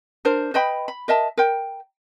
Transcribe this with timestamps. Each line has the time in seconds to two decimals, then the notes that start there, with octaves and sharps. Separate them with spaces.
0.25 D4 A#4 C5
0.54 B4 D#5 G5 B5
0.88 B5
1.08 A#4 D#5 E5 A5
1.38 A#4 G5